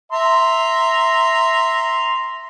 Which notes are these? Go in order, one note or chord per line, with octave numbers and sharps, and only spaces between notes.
E5 A#5 C6